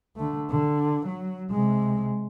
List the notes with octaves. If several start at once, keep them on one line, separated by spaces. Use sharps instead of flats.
D3 A3
D3
F#3
C3 G#3